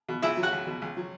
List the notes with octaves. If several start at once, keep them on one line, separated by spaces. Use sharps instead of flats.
B2
C#2 E4 E5
F#3
F#4 F#5
C#2
B2
C#2
F#3